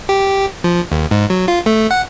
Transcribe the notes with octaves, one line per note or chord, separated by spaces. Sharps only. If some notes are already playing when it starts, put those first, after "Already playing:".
G4
F3
D#2
G#2
F#3
F4
A3
F#5